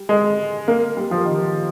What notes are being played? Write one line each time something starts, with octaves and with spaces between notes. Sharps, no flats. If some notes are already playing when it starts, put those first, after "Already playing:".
Already playing: G3
G#3
A#3
G3
F3
D#3